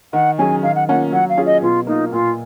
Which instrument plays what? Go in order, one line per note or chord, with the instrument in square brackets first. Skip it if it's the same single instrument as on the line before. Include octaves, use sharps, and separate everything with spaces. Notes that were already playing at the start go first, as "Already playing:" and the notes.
[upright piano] D#3 [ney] F#5
[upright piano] F#3 C#4 G#4 [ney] G#5
[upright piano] D#3 [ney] F5
[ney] F#5
[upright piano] A#3 C#4 F4 [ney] F#5
[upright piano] F#3 [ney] F#5
[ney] F5
[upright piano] C#4 F4 G#4
[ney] D#5
[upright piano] B2 [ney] F4
[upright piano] A#3 F4 [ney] D#4
[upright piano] A#2 [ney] F4